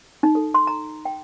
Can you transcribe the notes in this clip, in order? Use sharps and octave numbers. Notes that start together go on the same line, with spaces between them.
D#4
A4
C6
A#5
G5